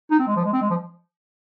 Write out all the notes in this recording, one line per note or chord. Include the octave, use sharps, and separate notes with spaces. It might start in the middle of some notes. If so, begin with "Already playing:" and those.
D#4
C4
G#3
F3
G#3
C4
G#3
F3